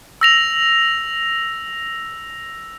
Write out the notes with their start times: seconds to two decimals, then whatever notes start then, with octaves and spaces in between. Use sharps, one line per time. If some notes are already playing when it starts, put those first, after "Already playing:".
0.21 E6 A#6 F7